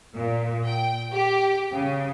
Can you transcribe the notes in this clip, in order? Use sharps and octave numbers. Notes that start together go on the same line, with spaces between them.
A#2
G5
G4
C#3